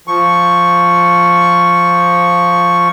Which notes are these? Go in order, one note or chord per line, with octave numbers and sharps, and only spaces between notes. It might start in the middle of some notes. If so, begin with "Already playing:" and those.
F3 C#6